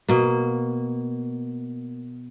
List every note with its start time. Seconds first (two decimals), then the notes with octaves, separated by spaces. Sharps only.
0.09 B2 A#3